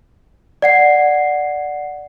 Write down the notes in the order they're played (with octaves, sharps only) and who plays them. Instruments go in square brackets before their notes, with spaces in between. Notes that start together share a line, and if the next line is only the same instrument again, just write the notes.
[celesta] D5 F#5 C7